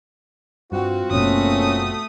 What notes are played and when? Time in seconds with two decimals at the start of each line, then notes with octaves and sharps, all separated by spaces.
0.72 G2 C4 F4 F#4
1.11 F#1 B2 A3 A#3 C#4 D#6